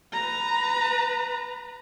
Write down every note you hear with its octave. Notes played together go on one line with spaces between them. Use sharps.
B4 A#5